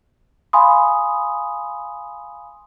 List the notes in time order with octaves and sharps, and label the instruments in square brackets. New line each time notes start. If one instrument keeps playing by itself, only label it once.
[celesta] F5 G#5 B5 C6 D#6